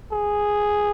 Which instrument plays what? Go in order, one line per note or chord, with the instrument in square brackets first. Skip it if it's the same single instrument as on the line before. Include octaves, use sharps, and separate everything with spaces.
[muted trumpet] G#4